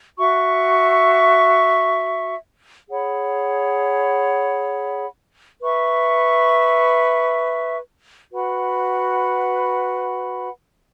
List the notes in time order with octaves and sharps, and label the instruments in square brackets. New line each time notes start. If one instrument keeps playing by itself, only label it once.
[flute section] F#4 E5 C#6
G#4 C#5 F#5 B5
B4 E5 C#6
F#4 B4 F#5 B5